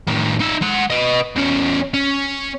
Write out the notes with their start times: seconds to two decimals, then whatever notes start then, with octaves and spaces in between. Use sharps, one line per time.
0.08 A2 D#3
0.41 D#4 E5
0.62 G#3 F#5
0.90 B4 D#5
1.36 E2 C#4
1.94 C#4